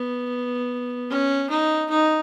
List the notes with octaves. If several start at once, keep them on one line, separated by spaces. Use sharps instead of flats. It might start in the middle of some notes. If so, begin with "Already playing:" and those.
Already playing: B3
C#4
D#4
D#4